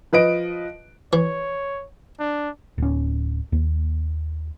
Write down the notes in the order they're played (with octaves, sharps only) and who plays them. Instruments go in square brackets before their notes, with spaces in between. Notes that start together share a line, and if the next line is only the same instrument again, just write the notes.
[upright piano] F3 B4 D#5 D7
[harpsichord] E3 [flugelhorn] C#5
[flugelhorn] D4
[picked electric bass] D1 C#4
D#2